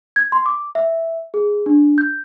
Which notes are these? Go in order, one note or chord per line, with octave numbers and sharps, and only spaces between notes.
G#6
C6
D6
E5
G#4
D4
G6